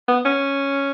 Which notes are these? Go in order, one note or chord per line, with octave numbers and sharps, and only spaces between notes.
B3
C#4